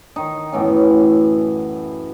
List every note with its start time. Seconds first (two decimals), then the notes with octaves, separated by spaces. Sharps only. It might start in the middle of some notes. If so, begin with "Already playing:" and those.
0.16 D#3 D#4
0.53 F#2 A2 E3 B3